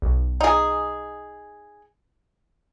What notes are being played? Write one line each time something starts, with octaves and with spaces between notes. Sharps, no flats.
B1
D#4 G#4